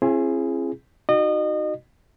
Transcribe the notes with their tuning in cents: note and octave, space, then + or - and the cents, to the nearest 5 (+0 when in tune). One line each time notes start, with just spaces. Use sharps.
C4 +40 E4 +45 G#4 +0
D#4 +0 F#4 +0 D#5 -35